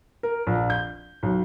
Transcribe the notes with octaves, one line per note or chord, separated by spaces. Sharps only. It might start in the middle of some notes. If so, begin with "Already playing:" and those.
A#4
A#1
G6
B1